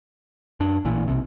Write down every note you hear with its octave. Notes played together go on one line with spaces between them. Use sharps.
F#2 D4
A1 A#2 E3
B1 C3